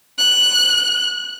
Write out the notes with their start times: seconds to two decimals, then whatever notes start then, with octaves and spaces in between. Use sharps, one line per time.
0.18 F#6